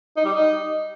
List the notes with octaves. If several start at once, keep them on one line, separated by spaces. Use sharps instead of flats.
D#4
G3
D#4